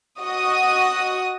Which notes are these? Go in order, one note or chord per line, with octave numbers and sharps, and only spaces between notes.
F#4 D#5 D#6